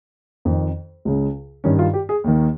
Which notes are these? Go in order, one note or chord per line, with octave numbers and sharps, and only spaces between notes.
F2 D#3
C#2 C#3
G2 D#3 C#4
F4
G4
G#4
D#2 D#3